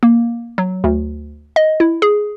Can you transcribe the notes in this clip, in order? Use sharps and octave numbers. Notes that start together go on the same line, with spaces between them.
A#3
F#3
D2
D#5
E4
G#4